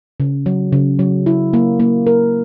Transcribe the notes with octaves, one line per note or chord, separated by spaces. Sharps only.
C#3
F#3
C#3
F#3
E4
A#3
A#3
A#4